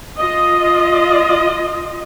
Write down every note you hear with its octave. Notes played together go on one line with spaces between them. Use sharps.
F4 D#5